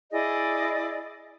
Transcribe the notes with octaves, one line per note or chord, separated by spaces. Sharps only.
E4 G#4 D5 D#5